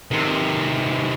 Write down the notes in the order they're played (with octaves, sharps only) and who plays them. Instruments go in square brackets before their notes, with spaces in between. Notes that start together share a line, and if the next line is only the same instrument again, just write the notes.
[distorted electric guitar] C3 D#3